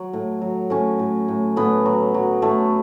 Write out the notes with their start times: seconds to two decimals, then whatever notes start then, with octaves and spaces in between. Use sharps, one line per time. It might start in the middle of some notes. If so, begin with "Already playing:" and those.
Already playing: F#3
0.13 A2
0.41 F#3
0.70 A2 C#4
0.99 A2
1.28 A2
1.56 A2 B3
1.85 F#3
2.14 F#3
2.42 A2 A3